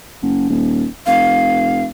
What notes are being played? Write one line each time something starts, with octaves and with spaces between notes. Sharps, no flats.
F#1
D#1
F1 F5